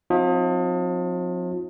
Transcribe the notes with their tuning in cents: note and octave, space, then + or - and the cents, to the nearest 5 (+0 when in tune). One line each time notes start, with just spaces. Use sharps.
F3 +40 C4 +0 E4 -45